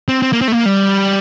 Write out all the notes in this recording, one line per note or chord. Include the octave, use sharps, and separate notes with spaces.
C4
C4
A#3
C4
A3
A#3
G3